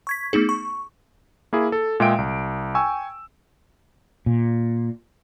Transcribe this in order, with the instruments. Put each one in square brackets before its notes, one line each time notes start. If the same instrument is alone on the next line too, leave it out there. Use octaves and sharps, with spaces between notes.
[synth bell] C#6 G#6 B6
A3 B3 D#4 G#4
C#6
[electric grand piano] A#3 E4 G#4
A4
A#2 G#3 G#4 E5 G5 D7
C2
G5 G#5 C#6 E6
[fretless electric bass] A#2